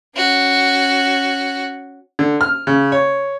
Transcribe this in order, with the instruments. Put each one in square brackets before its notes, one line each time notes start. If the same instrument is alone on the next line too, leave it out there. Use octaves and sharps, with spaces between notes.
[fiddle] C#4 F#4
[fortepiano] D3
F6
C#3
C#5